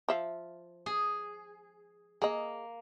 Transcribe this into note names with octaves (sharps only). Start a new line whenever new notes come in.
F3 E5 F5
G#4
A#3 G#4 D#5